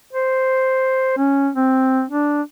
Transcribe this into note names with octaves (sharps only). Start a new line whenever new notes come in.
C5
C#4
C4
D4